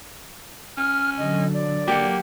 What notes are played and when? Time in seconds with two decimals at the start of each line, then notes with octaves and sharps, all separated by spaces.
0.77 C#4 F6
1.18 D3 F#3 D#5
1.53 D5
1.88 A#3 G4 F#5